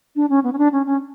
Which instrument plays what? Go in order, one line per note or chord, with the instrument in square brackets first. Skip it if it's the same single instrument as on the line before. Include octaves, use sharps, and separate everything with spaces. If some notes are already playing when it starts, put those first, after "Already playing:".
[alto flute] D4
C#4
B3
C#4
D4
C#4
C#4